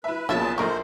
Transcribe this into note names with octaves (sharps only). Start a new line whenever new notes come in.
E4 B4 E5
B1 A#2 C#3 F3 E4 F#4 E5 A5
A#1 A3 D#4 A#4 C5 C#6